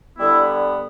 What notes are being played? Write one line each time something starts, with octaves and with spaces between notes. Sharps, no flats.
D3 G3 B3 E4